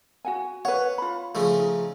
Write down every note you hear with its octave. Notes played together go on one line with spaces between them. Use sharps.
F#4 F#5 G#5
B4 C#5 F#5
F4 B5
C#3 F3 A3
D#4